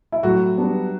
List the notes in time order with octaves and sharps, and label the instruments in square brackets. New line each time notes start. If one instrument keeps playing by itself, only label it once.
[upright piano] E4
[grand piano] A2 [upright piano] F#3 F#4
[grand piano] G3 B3 D4